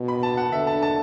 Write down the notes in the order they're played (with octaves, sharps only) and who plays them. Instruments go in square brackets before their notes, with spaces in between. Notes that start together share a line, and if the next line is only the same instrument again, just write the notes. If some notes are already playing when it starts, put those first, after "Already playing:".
Already playing: [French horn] B2
[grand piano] B5
A5
F#5
[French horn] D3 [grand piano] E5
[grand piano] A5
A5